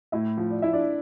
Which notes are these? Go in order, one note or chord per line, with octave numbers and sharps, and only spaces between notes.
A2 E4 E5
F3
D5
E4 E5
D4 D5